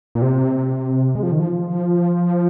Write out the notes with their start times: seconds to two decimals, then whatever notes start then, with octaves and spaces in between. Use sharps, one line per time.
0.15 A#2
0.22 C3
1.15 G#3
1.23 F3
1.32 D#3
1.39 F3